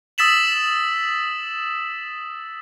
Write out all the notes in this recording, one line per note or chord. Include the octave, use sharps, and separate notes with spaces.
D#6 E6 A6 B6 E7 F#7